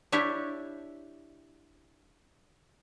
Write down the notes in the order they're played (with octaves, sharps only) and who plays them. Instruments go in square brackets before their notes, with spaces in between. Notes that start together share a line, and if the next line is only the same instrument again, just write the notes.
[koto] D4 E4 G4 C#5 E5